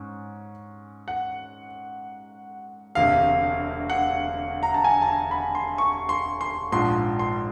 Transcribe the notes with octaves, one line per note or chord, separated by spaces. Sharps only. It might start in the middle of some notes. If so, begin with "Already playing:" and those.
Already playing: G#2 C#4
F#5
E1 D2 C3 F5
F#5
A#5
A5
G#5
A5
A#5
B5
C6
C#6
C6
C6
A#1 G#2 F3 C6
C6